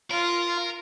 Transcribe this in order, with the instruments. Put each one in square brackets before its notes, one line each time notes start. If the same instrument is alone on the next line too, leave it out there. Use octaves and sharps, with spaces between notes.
[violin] F4 [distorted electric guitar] A#4